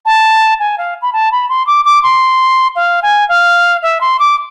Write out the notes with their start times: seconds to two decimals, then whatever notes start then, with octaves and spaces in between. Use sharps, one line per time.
0.06 A5
0.60 G#5
0.78 F5
1.02 B5
1.13 A5
1.32 B5
1.49 C6
1.67 D6
1.85 D6
2.03 C6
2.76 F5
3.03 G#5
3.29 F5
3.83 E5
4.01 C6
4.20 D6